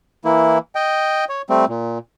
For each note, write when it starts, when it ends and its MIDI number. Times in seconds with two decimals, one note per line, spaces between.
0.25 0.58 52
0.25 0.58 58
0.25 0.58 64
0.75 1.25 75
0.75 1.25 79
1.29 1.42 73
1.50 1.65 55
1.50 1.65 57
1.50 1.65 60
1.68 1.98 46